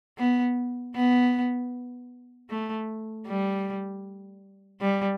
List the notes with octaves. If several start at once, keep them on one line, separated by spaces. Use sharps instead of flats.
B3
B3
A3
G3
G3